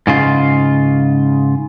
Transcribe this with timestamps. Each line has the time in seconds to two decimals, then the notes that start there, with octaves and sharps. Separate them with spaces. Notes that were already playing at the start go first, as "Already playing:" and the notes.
0.07 G#2 C#3 F4